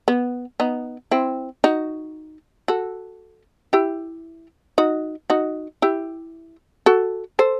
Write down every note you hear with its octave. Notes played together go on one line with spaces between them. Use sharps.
B3
B3 D#4
C4 E4
D#4 F#4
F#4 A4
E4 G4
D#4 F#4
D#4 F#4
E4 G4
F#4 A4
A4 C5